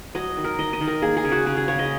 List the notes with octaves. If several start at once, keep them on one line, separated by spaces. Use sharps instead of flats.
F#3 D#5
D#3
A#4
D#3 D#5
D#5
D#3
A#4
A#3 G#4
G#4
C#3
F#4
C#3 G#4
G#4
C#3 C#5
D#5